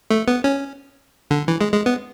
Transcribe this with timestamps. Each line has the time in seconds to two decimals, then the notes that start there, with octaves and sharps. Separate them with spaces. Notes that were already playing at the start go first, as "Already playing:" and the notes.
0.10 A3
0.28 B3
0.44 C#4
1.31 D3
1.48 E3
1.61 G#3
1.73 G#3
1.86 B3